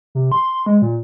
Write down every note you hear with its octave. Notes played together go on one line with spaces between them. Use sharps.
C3
C6
G#3
A#2